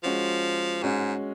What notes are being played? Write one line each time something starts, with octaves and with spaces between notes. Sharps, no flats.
F3 G#3 C#4 F#4
G#2 G#3 C#4 F#4